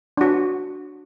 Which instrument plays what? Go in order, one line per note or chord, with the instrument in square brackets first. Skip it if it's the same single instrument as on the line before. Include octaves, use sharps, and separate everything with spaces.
[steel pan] D4 F#4